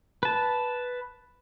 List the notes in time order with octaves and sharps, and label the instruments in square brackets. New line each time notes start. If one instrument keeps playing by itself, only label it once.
[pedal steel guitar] B4 A5